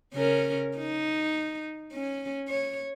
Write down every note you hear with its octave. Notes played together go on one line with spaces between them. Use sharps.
C#3 C#4 A#4
D#4
C#4
C#5